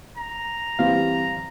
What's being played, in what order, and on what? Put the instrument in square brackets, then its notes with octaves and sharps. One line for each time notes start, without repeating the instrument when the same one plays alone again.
[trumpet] A#5
[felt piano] E3 G3 C4 [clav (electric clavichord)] F5